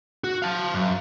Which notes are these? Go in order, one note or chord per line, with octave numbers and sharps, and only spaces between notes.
F#4
F5 A5
F#2